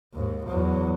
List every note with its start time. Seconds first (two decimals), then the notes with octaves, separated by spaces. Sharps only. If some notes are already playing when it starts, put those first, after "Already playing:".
0.14 D#2 G#2
0.45 E2 F#3